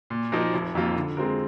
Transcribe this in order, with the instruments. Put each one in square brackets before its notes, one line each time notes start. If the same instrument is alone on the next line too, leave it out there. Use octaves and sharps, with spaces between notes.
[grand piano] A#2
F3 A#3 D#4 A#4
F1
F2 D#3 A#3 F4
D3
G#3 C4 F4 A#4